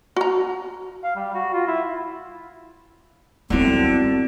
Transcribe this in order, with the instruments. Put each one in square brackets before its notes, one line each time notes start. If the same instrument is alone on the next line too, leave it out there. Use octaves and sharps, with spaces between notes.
[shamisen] F#4 A#5
[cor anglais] F5
G3
F#4
F4
E4
[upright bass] F#2 G3 [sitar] D3 [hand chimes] B3 E4 F#4 [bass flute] C4